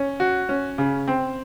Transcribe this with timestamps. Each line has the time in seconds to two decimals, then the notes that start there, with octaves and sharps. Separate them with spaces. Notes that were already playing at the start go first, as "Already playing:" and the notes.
Already playing: C#4
0.20 F#4
0.49 C#4
0.78 C#3
1.08 C4